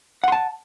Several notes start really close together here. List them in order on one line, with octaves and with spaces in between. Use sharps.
F#5 C6 A5